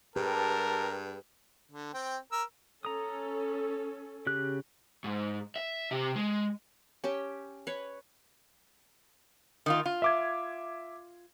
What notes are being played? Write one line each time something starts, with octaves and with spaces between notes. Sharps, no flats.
G2 G4 G#4 A#4 B4 A5
D3
C4 G5
A#4 E6
C#4 A4 A#5 D#6
C#3 G4 F#6
G#2
E5
C3 G4
G#3
C#4 G4 G5 A5
B4 C#5
D#3 A#3 F4
F4
E5 D6 G#6